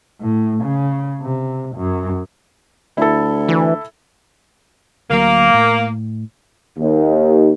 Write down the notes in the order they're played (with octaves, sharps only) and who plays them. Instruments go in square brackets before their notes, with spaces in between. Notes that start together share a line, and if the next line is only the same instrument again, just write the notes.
[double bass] A2
C#3
C3
F#2
[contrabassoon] D2 [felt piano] E4 A4
[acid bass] E3
[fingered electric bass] D2 F#3 [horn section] A#3
[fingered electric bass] A2
[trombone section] D#2